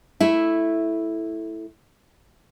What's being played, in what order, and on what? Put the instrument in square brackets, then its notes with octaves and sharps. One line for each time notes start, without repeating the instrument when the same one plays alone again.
[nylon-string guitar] A3 E4